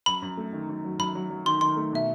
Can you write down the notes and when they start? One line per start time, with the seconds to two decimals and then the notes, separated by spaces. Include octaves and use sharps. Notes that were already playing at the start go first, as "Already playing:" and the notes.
0.06 F#2 B5
0.22 F#2
0.37 A3
0.53 D#3
0.69 F#2
0.85 F#3
0.99 F#2 B5
1.15 F#3
1.30 F#3
1.46 D#3 C6
1.61 D#3 C6
1.76 A3
1.93 B2 E5